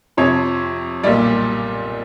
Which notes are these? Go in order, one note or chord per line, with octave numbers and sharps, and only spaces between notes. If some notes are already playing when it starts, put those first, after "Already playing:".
F2 C3 F3 C#5
B1 A#2 G3 D5